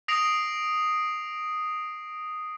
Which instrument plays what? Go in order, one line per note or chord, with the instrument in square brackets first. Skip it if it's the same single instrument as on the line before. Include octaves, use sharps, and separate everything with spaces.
[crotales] D#6 A#6 C7 D7 F7